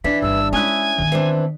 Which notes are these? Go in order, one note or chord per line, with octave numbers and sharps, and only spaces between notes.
E3 D4 E4 B6
G1 G2 D#3 E6
G#3 C#4 E4 G#5 D#6 F#6
D#3 B3
E3 C4 D4